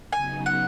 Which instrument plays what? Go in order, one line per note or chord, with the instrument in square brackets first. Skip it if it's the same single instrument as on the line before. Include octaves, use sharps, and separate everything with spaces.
[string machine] C#3 F#3 B3 D#4 [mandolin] G#5
[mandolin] F#5